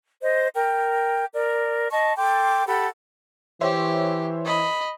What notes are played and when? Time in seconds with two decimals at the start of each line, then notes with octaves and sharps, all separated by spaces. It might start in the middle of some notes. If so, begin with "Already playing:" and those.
0.22 C5 D#5
0.54 A#4 G5
1.33 A#4 D5
1.91 D#5 A5 C#6
2.17 A4 G5 C6 D6
2.67 G4 A4 F#5 B5
3.61 E3 G4 C5 C#5 E5
4.45 D#5 B5